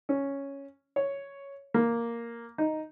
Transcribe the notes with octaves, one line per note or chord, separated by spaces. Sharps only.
C#4
C#5
A#3
D#4